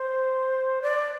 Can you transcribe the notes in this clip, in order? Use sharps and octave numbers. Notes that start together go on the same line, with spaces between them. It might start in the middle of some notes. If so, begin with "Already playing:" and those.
Already playing: C5
D5